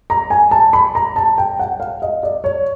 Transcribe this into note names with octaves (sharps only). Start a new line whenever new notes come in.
A#5
G#5
A5
B5
A#5
A5
G5
F#5
F5
D#5
D5
C#5